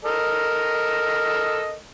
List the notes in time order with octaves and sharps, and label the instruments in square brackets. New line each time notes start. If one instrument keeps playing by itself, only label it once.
[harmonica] A4 A#4 D#5